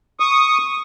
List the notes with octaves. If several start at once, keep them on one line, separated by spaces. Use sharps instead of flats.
C#6 D#6